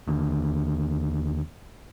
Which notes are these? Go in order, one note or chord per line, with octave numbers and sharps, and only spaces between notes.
D#2 D3